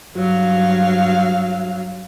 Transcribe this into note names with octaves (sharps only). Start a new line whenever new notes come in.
G2 F#3 F5